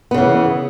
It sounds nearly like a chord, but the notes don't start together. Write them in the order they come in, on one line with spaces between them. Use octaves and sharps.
B3 C#3 E3